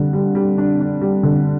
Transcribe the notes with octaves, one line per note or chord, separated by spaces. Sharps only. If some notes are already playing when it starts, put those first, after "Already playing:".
Already playing: D3 G3
G3
G3
D4
D4
G3
D3